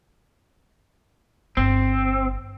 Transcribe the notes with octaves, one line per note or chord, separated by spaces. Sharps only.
G1 C4